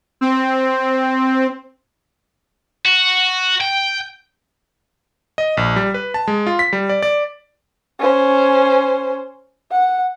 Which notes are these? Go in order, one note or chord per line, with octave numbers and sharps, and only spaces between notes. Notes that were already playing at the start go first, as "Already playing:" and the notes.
C4
F#4
G5
D#5
A#1
G3
B4
A5
G#3
F4
B6
G3
D5
D5
C#4 C5
F#5